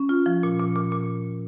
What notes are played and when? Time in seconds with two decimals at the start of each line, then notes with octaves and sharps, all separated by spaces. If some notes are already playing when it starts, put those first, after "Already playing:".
Already playing: C#4
0.09 F4
0.26 F3
0.43 A#2
0.59 A#2
0.76 A#2
0.92 A#2